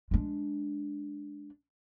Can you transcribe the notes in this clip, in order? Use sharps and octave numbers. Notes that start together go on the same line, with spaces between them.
G#3 D4